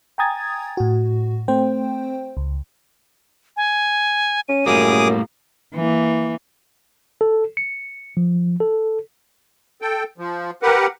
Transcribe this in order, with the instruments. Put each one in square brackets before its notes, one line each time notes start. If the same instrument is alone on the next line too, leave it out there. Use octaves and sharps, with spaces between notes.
[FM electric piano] G5 G#5 A#5 D#6 G#6 A6
A2 F#4
A3 C4 C5 G5
C#2
[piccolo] G#5
[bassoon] C#4 [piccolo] D#7
[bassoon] F#2 [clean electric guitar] A2 G3 A#3 [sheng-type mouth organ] G#4 D6 D#6
[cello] E3 A#3
[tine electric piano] A4
C#7
F3
A4
[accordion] A4 G5
F3
G4 A#4 B4 F#5